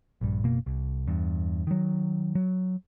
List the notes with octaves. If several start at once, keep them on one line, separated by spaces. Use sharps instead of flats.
A#1 G2
F#1 B2 A#3
C2
E2 G2
D#3 F#3
F#3